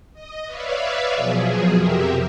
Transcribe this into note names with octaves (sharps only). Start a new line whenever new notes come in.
D#5
B4 C#5 D5 E5 F5
B2 F3 F#3 G#4
F2 C3 G4 A#4 E5